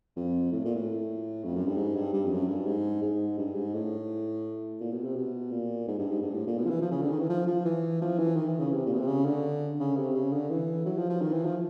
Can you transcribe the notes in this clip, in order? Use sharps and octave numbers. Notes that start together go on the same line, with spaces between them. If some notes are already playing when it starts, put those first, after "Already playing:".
F2
A2
A#2
A2
F2
F#2
G2
G#2
G2
G2
F2
F#2
G2
G#2
G#2
G2
G#2
A2
A#2
B2
C3
B2
A#2
G#2
G2
G#2
G2
A2
A#2
B2
F3
E3
F3
C#3
D3
D#3
E3
F3
F3
E3
F3
E3
D#3
E3
C#3
C3
A#2
B2
C3
C#3
D3
C#3
C3
C#3
D3
E3
F#3
F3
F3
D#3
E3
F3